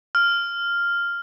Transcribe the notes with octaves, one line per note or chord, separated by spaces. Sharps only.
F6